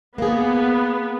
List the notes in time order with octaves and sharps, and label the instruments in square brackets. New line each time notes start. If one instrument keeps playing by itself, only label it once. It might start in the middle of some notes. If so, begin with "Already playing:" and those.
[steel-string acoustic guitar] A#3 G#4 [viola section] B3